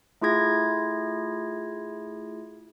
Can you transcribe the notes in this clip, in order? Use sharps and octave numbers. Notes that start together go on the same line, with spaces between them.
A3 E4 F4 G#4 G#6 A#6